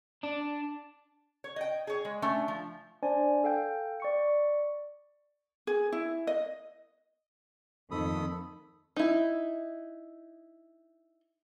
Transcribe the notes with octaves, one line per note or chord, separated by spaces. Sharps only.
D4
C#5
D#5 G5
G#4 C#5
G#3
A3 C#4 D4
F3
D4 C5 D5 G#5
A4 F5 G5 G6
D5 C#6 C#7
G#4
E4
D#5
F2 D#3 A3 A4 B5 D#6
D#4 E4